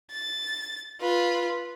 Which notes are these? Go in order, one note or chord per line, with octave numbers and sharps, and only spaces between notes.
A6
F4 B4